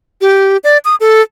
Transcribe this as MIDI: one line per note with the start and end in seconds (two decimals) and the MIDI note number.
0.21 0.57 67
0.64 0.78 74
0.85 0.95 87
1.00 1.22 69